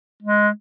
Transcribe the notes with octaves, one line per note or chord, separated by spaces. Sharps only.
G#3